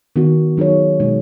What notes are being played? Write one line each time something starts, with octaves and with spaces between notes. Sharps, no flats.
D#3 B3 F#4
F#3 D#4 G#4 C#5
B2 G#3 D#4